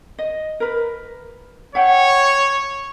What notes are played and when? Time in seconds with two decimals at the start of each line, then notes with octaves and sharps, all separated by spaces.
0.18 D#5
0.60 A#4 B4
1.75 C#5 E5 F#5 G5